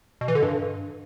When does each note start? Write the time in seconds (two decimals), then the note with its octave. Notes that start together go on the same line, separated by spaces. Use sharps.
0.21 B2
0.28 E3
0.35 D3
0.42 G2